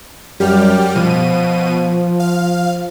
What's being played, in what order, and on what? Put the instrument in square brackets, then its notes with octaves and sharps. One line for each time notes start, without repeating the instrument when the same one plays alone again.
[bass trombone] F#2 [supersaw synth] G3 G4 F6
[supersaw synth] B2 D#7 [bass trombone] F3
[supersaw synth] F5